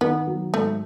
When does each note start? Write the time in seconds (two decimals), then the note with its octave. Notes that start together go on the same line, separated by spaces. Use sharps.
0.01 D#3 B3
0.27 F#3
0.54 G#2 A3